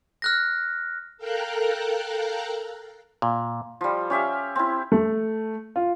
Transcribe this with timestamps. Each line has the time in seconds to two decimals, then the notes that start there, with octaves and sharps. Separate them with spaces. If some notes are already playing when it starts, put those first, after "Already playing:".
0.22 F6 F#6 A#6
1.18 A4 A#4 F5 G5 A#5 F#6
3.22 A#2
3.81 F3 G3
4.10 C#4 G4 E5 F5
4.56 C4 E4
4.92 A3
5.76 F4